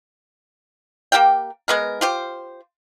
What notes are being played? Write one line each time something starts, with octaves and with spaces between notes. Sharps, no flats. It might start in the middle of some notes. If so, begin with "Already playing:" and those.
A#3 G4 F5 G5
G#3 B3 A#4
F4 G4 C5